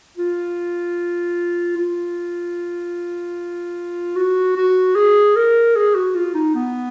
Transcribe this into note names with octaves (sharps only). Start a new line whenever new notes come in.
F4
F4
F#4
F#4
G#4
A#4
G#4
F#4
F4
D#4
B3